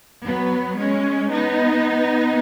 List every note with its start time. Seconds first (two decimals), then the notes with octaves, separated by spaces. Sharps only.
0.24 F#3 B3
0.78 G#3 C#4
1.32 B3 D#4